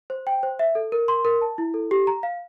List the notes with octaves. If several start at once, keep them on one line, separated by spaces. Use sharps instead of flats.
C5
G5
C5
E5
A4
A#4
C6
A#4
A5
E4
A4
G4
A#5
F5